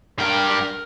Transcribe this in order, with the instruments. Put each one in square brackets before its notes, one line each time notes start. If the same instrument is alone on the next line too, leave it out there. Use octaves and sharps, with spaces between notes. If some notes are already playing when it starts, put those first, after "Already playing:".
[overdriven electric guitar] G2 G5 [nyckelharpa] A#4